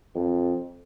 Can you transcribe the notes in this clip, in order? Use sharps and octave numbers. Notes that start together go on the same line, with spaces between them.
F2